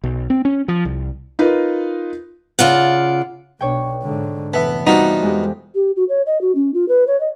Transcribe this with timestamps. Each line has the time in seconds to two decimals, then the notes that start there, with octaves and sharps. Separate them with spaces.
0.04 B1
0.30 C4
0.45 C#4
0.68 F3
0.85 C2
1.39 D#4 F4 A#4 B4
2.59 C#3 F4 D5 F#5
3.61 B1 B2 D4 C#5 G5
4.03 G#2 D3
4.54 F1 E3 B3 E5 A5
4.87 G3 B3 C4 D#4 F4 F#4
5.22 F2 G#3 G4
5.75 G4
5.96 F#4
6.09 C#5
6.26 D#5
6.41 F#4
6.55 C#4
6.74 F4
6.88 B4
7.07 C#5
7.20 D#5